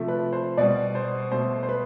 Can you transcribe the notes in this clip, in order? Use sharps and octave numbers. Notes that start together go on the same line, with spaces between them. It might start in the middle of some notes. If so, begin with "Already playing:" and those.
Already playing: C3 F3 A3
B4
C5
B2 G3 D5
C5
B2 A3 C5
C5
B4